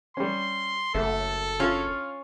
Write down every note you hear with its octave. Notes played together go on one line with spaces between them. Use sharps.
G3 C#4 C6
F#1 A3 A4
C#4 F4